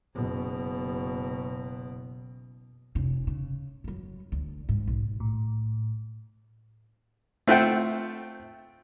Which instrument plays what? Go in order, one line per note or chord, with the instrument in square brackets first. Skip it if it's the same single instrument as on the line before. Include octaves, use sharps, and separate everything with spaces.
[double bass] F#1 B2
[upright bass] F1 C#4
C#3
F#2 F#3
D2
G#2
B1
[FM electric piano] A2
[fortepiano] A3 C4 F4 E5 F#5 G5